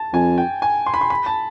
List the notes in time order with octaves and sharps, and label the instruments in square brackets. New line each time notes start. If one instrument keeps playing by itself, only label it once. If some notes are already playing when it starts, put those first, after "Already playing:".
Already playing: [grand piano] A5
[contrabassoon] F2 [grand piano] G#5
[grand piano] G5
G#5
C6
B5
C6
B5
A5